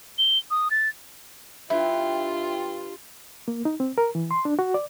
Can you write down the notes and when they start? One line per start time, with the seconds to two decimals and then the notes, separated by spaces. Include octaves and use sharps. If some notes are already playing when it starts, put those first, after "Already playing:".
0.18 G7
0.51 D#6
0.71 A6
1.70 G2 E4 F4
3.48 A#3
3.65 D#4
3.80 C4
3.98 A#4
4.15 E3
4.31 C6
4.45 D4
4.59 F#4
4.74 D5